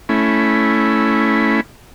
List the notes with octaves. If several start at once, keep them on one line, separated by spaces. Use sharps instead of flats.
A3 C#4 E4